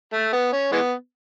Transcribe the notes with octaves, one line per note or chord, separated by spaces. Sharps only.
A3
B3
C#4
E3 G#3 B3